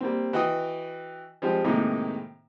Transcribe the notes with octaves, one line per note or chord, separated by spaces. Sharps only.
G3 A#3 C4
E3 F#4 D#5 G5 D#6
F3 G3 G#3 C4 G4
A2 C3 D#3 G#3 A#3 D#4